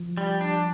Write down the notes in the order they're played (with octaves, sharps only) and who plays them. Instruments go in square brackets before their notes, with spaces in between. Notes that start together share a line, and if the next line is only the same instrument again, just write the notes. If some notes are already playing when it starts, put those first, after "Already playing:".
Already playing: [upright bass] F3
[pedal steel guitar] G3
D4